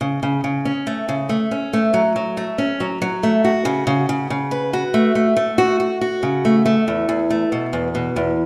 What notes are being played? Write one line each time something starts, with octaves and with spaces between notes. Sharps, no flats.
C#3
C#3
C#3
C#4
A3
C#3
A3
C#4
A3
F#3
F#3
A3
C#4
F#3
F#3
A3
F#4
C#3
C#3
C#3
C#3
B4
F#4
A3
A3
A3
F#4
F#4
F#4
C#3
A3
A3
E2
E2
A3
B2
E2
B2
E2